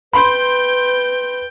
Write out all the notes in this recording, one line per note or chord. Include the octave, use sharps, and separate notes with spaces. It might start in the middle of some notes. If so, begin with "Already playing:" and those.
B4 G5 B5 C6 G6